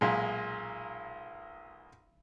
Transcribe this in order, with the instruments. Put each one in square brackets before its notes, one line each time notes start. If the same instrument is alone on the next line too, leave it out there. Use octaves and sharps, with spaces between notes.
[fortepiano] B1 A#2 G#3